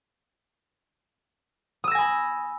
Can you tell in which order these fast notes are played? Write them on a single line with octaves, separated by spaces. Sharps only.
D#6 E6 A#6 G#5 B5